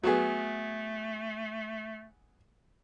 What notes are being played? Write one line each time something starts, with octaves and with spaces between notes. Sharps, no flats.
F#3 A3 B3 G#4